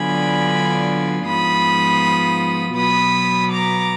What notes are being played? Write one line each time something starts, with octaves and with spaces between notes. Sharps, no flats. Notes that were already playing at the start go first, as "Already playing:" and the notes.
Already playing: D3 F#3 B3 D4 F4 G#5 B5
G#2 F3 B3 F4 B5 D#6
B2 F#3 B3 B5 D#6
A#5 D6